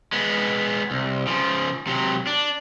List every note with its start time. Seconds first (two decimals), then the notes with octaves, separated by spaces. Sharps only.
0.12 G#3 B3
0.91 C2
1.27 C#3 F3
1.87 C3 F#3
2.27 D4